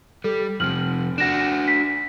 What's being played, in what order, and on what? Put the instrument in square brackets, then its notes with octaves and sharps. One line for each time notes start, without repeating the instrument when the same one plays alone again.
[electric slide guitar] G3 [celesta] A4
[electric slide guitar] F2 C3 [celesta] F6 F#7
[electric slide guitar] D4 F#4 [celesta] A#6 E7
[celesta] B6